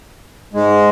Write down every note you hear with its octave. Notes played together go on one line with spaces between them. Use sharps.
G#2 G#3